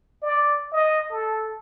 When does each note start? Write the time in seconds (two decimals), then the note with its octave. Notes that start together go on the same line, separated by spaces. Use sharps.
0.22 D5
0.72 D#5
1.11 A4